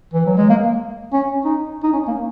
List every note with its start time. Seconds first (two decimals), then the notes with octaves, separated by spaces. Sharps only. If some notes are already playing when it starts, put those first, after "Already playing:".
0.14 E3
0.27 F#3
0.37 G#3
0.50 A#3
1.13 C#4
1.45 D#4
1.83 D#4
1.93 C#4
2.08 A#3